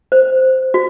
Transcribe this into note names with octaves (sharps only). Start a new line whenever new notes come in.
C5
F#4